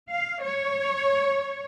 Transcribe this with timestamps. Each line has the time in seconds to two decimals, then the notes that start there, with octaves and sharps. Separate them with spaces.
0.10 F5
0.42 C#5